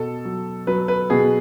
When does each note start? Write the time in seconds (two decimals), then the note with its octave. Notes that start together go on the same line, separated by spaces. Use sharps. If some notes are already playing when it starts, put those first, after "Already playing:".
Already playing: B2 A4
0.25 F#3
0.67 F#3 B4
0.88 B4
1.10 B2 G#4